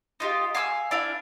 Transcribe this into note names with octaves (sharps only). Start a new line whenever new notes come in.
D#4 F4 G4
F5 G#5 D6 E6
D4 E4 F5